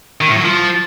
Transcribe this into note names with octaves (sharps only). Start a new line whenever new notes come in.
D#3
A2
F#3
F3